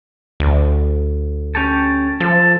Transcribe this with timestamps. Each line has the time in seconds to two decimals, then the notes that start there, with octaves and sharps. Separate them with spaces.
0.40 D2
1.55 C#4 G4 A4
2.20 F3 A4